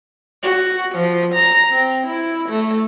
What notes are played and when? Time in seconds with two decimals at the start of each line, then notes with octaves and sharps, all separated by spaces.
0.43 F#4
0.95 F3
1.35 A#5
1.71 C4
2.07 E4
2.49 A3